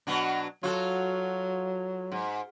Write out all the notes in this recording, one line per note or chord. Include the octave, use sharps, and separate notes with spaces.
B2 F#3 D4
F#3 F4 F#4 A4
G#2